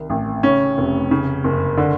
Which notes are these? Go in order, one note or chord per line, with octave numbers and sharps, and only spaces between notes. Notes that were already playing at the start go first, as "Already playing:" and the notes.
Already playing: C2 D#3
A1
C#3 C#4
F1
C#3
F#1
D3